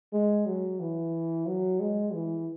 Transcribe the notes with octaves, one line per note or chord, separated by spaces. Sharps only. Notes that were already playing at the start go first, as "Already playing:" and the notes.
G#3
F#3
E3
F#3
G#3
E3